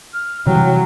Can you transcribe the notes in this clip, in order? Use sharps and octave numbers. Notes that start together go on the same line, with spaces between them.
F6
C3 E3 F#3 G3 G5